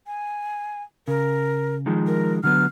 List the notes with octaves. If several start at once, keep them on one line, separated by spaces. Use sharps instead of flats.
G#5
C#3 A#4
D#3 F3 G#3
A#4
D3 F#3 B3 F6